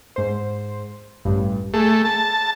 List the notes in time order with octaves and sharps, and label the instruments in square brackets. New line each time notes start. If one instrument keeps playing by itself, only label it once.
[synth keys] G#2 C5
A1 G2
[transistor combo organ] A3 [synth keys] G#4
[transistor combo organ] A5